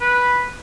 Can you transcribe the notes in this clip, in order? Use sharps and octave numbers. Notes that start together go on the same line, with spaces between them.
B4